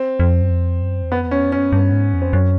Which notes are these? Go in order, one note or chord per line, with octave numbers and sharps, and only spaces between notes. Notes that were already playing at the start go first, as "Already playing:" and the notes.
Already playing: C4
F2
F#2
F2
F#2
E2
F2 B3
E2
C#4
F2
F#2 C#4
G2
G#2
F2
C4
F#2 C#4